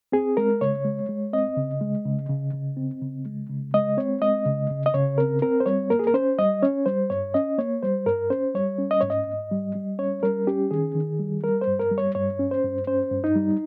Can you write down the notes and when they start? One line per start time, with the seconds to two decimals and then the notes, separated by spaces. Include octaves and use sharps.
0.12 C4 G#4
0.37 G#3 A#4
0.61 C#3 C#5
0.85 G#3
1.09 G#3
1.33 C4 D#5
1.57 C#3
1.81 G#3
2.05 C#3
2.29 C#3
2.54 C#3
2.77 C4
3.02 C#3
3.26 G#3
3.50 C#3
3.74 G#3 D#5
3.98 C4 C#5
4.22 G#3 D#5
4.46 C#3
4.70 C#3
4.86 D#5
4.94 C#3 C#5
5.18 C4 A#4
5.42 C4 A#4
5.60 C5
5.66 G3 C#5
5.90 A#3 A#4
5.99 G#4
6.07 A#4
6.14 C#4 C5
6.38 G3 D#5
6.63 C#4 C#5
6.86 G3 C5
7.10 G2 C#5
7.34 C#4 D#5
7.58 A#3 C#5
7.83 G3 C5
8.06 G2 A#4
8.30 C#4 C5
8.55 G3 C#5
8.78 C#4
8.91 D#5
9.01 G#2 C#5
9.10 D#5
9.26 G#2
9.51 G3
9.75 G3
9.99 C#4 C#5
10.23 G3 A#4
10.47 C#4 G4
10.71 D#3 G#4
10.95 D#3
11.19 G3
11.44 G3 A#4
11.61 C5
11.67 G2
11.79 A#4
11.91 G3
11.98 C#5
12.15 G2 C#5
12.39 C#4
12.51 C5
12.64 G2
12.87 C#4 C5
13.11 G2
13.24 D#4
13.36 G3